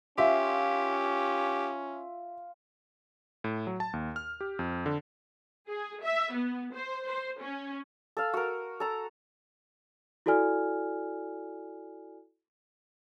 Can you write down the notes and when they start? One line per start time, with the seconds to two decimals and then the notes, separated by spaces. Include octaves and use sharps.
0.18 C#4 F4 G4 E5
3.44 A2
3.67 F#3
3.80 A5
3.93 D#2
4.16 F6
4.41 G4
4.59 F2
4.86 D3
5.67 G#4
6.02 E5
6.33 B3
6.73 C5
7.05 C5
7.40 C#4
8.17 A4 F5
8.33 F#4 A#4
8.80 A4 A#5
10.26 E4 F#4 A4 D5 G#5 F6